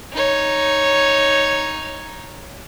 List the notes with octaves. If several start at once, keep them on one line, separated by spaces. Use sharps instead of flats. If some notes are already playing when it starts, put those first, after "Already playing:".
D#4 C#5